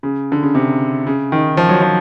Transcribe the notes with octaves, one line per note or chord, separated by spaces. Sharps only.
C#3
D3
C#3
C3
C#3
D#3
F3
F#3
F3